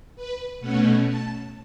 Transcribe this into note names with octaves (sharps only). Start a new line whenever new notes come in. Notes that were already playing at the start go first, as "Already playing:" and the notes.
B4
B2 A3 C#4 F#5
A5